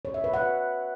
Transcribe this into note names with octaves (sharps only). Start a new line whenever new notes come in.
C#5
E5
B4
F#5